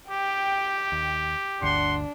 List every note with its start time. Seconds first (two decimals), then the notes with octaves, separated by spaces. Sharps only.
0.10 G4 G5
0.92 D#2
1.62 G1 D2 D4 F#5 C6